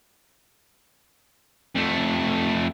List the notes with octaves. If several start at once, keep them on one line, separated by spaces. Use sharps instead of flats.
F2 A3